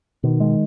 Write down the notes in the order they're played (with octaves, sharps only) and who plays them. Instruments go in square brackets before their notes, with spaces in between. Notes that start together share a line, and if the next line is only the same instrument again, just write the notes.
[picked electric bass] B2 [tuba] D#3
[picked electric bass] G#3